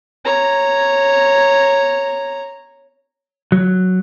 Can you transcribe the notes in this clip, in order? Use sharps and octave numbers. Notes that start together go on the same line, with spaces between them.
C#5 A#5
F#3